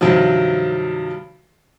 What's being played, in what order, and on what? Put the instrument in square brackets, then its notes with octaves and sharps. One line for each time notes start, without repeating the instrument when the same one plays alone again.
[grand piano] G2 C3 D#3 F3 F#3